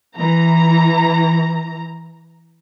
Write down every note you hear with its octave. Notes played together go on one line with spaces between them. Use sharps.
E3 A#5